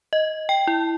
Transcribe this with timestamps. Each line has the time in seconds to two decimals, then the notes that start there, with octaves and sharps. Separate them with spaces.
0.13 D#5
0.49 G5
0.67 E4